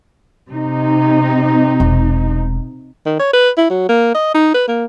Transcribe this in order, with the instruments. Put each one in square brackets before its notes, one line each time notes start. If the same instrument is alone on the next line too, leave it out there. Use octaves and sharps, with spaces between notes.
[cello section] C3 D#4
[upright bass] E1
[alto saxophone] D#3
C#5
B4
E4
F#3
A#3
D#5
D#4
B4
A#3